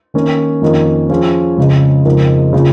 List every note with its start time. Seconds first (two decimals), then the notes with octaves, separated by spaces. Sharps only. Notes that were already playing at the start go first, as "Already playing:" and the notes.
0.14 D#3 A#3 C#4 A#4
0.61 F2 D#3 A#3 C#4
1.09 F3 C#4 G#4
1.57 F2 C#3 G#3
2.05 F2 C#3 G#3 D#4 A#4
2.53 C#3 A#3 F4